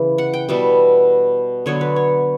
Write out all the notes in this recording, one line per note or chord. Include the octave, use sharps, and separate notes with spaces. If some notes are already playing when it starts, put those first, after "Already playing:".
Already playing: C#3 E3
F#5
G5
B2 G3 B3 E5
D3 F#3 B3 C#5
B4
C#5